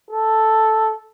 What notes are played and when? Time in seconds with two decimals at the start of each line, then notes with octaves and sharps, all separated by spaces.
0.10 A4